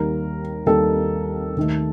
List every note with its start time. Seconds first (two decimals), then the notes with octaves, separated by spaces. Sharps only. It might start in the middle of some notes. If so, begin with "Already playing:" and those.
Already playing: D#2 D#3 G3 A#3 A#4
0.66 D#2 D#3 G3 A#3 A4
1.57 D#2 D#3 A3